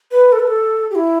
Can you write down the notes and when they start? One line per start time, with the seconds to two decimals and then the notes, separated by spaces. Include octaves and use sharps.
0.11 B4
0.32 A4
0.39 B4
0.47 A4
0.91 G4
0.95 E4